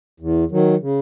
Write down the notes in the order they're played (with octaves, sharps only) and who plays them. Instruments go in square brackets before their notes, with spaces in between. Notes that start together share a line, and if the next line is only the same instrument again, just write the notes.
[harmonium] E2
D#3 F#3
C#3